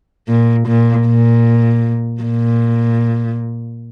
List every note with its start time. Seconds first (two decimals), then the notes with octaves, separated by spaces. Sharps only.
0.29 A#2
0.67 A#2
1.07 A#2
2.22 A#2